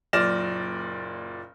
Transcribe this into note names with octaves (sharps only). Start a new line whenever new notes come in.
F#1 A#2 D5 F6 A#6 E7